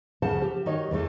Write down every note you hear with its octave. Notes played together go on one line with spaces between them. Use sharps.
D2 C#3 F3 C5 F#5 A5
G4
D#3 D#4 F#4 G4 C#5 D#5
E2 E3 A3